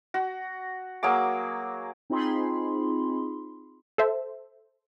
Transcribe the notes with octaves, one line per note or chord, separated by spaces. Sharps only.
F#4
F#3 A#3 G#4 D6
C4 D#4 F4 G#4 B5 C6
A4 C5 E5